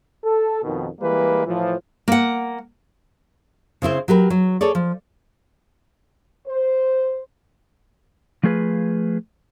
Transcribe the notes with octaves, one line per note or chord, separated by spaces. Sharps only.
A4
F2 B2 D#3
E3 G3 G#3 A#3 B4
A2 E3 F3
A#3 F#5
C#3 C4 E4 C5
F#3 G4 A#4 B4
F#3
G#4 A4 C#5 D5
F3
C5
F3 A3 F4 G#4 B4